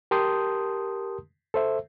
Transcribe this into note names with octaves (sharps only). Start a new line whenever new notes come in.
G4 A#4 A5 C6 D#6 G6
A4 C5 E5